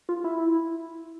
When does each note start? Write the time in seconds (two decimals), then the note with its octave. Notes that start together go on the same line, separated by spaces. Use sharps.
0.09 F4
0.24 E4